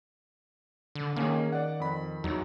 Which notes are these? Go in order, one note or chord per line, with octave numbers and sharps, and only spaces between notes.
D3
D#3 A#3 C#4 G#4
D5 F#5
F2 B5
E2 F#3 D#4